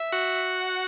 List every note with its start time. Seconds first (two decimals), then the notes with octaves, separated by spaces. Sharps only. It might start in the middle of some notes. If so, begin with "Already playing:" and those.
Already playing: E5
0.12 F#4 F#5